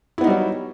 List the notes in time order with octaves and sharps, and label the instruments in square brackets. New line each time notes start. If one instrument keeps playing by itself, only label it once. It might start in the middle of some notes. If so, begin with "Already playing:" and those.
[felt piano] E4
B3
D#4
G3
F#3